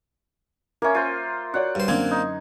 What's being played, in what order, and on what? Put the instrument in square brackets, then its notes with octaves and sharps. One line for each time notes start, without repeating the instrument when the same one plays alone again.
[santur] A#3 C#4 [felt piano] A#4 E5
[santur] F4 C5
[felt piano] F#4 C#5 D5 [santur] F#5
[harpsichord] G2 C5
[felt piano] F#2 D3 G#6 [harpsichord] A#3 C4 D4
[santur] D#4